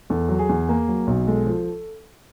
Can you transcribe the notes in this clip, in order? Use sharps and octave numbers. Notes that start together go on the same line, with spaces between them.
E2 A4
F#3
G#4
E2
A#3
F#3
B1
G#3 A4
F3